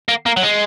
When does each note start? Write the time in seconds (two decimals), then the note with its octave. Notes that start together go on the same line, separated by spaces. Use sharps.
0.09 A#3
0.26 A#3
0.37 F#3
0.43 G#3